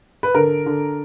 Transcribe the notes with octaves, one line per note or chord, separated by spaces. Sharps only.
B4
D3 A#4
D3